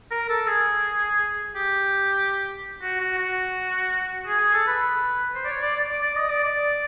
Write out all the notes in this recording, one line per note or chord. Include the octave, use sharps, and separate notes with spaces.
A#4
A4
G#4
G4
F#4
F#4
F#4
G#4
G#4
A4
B4
C5
D5
C#5
D5
D5
D5
D5
D#5
D5
D5